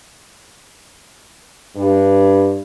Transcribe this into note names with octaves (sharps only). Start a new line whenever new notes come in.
G2